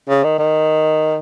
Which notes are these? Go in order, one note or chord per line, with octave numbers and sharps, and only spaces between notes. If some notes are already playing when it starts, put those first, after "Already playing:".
C#3
D#3
D#3